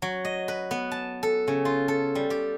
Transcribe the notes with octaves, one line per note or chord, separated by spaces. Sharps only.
F#3
D#5
B4
B3
A5
A4
C#3
F4
A4
G3
G4